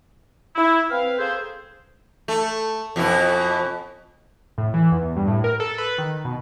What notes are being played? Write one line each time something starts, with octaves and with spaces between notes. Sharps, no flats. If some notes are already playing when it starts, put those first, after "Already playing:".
E4
C4 B4 F5
A#3 G#4 A4 C5
A3
F2 B2 E4
A2
E3
E2
G2
A2
A#4
A4
B4
D#3
B2